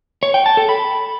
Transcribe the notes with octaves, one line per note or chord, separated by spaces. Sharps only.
C#5
G5
A5
A4
B5